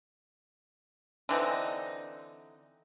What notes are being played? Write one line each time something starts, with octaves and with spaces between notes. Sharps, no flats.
D3 E3 C4 D#4